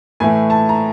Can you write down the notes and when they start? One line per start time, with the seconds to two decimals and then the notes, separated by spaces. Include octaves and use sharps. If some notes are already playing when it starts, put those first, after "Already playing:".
0.20 A2 E3 A3 G#5
0.50 A5
0.69 A#5